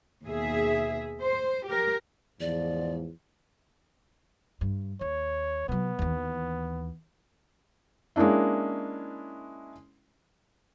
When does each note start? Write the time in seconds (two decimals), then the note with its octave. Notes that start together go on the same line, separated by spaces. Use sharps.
0.24 D#2 B2 G#4 E5
1.21 C5
1.67 G4 A#4
2.40 E2 G#2 F3 D5
4.61 G2
5.01 D#2 C#5
5.69 C3 F#3 B3
5.99 D#2 E3
8.16 G#3 A#3 C#4 D4 E4